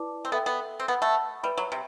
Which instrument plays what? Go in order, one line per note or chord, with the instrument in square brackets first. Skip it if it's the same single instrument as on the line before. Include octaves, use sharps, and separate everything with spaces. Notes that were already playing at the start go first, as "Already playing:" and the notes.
Already playing: [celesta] E4 B4 D5 A5 D6
[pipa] C4
[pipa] B3 [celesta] A4 E5 G5
[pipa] B3
C4
[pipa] B3 [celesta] B4 F#5 B5
[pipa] A3
[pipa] G3 [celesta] B4 E5 B5
[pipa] F#3
C3